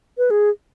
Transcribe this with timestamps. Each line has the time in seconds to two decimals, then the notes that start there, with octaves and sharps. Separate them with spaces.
0.18 B4
0.30 G#4